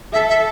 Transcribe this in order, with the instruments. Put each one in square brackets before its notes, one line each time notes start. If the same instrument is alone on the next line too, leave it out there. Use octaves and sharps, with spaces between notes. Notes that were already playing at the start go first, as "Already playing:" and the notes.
[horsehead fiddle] A4 [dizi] E5
[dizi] E5